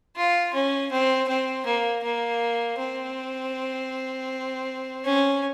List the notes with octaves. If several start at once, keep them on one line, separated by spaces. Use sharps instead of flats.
F4
C#4
C4
C4
A#3
A#3
C4
C#4